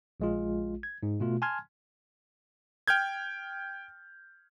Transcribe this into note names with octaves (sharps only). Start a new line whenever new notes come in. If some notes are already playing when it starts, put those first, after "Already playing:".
A#1 G#3 F4
G#6
G#2
B2 A3 F4
G#5 A5 C6 F6 G#6
G5 F6 G6 G#6